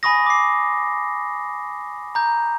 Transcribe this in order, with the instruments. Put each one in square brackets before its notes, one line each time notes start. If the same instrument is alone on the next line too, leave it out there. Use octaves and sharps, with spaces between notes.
[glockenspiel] G#5 B5 C#6 D#6 A#6
D6 C7
A#5 G6